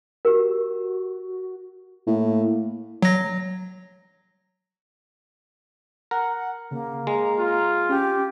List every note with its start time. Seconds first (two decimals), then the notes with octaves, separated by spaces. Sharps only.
0.25 F#4 G4 A#4
2.07 A2 A#3
3.02 F#3 A#6
6.11 A#4 F#5
6.71 C#3 A#3
7.07 G#3 A#5
7.39 F4
7.89 C#4 G4